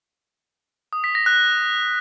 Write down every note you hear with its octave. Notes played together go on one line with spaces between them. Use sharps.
D#6
B6
A#6
F#6